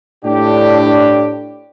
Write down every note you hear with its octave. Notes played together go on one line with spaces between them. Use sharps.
A2 D4 G4